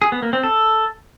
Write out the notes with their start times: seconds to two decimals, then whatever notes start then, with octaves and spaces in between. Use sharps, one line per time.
0.02 G#4
0.12 B3
0.23 A#3
0.33 C4
0.43 A4